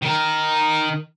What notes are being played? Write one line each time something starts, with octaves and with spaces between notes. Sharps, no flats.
D#3 A#4